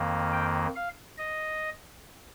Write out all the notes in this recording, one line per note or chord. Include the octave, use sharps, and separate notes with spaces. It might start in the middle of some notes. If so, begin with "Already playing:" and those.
Already playing: F2 D#3 A#3
G5
F5
D#5